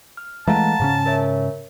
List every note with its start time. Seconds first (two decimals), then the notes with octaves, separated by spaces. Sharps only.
0.17 F6
0.47 E3 G#3 A3 F5 F#5 A5 A#5
0.80 G#2 C#3 C#4
1.06 A#4 C#5 E5